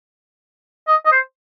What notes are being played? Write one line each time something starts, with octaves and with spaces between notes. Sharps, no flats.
D#5
D#5
C5